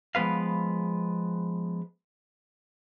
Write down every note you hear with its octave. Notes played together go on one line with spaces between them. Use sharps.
F3 G#3 B3 B4 F5